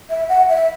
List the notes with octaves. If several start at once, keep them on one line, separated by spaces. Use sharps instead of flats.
E5
F#5
E5